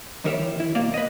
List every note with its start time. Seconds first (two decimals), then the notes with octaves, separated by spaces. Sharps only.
0.24 D#2 D#3 G3 A#4 C#5 E5
0.39 E3
0.56 D#3 E4
0.75 B1 B2 A#3 D5 F5
0.94 B4 D#5